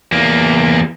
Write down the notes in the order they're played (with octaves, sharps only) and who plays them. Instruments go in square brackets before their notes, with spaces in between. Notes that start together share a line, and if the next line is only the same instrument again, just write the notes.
[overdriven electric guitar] E2 A#3